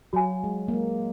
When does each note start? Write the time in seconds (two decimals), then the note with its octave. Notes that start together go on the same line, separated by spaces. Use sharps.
0.13 F#3 F#4 C#5 F5 G#5
0.44 G#3
0.68 A#3
0.73 G#3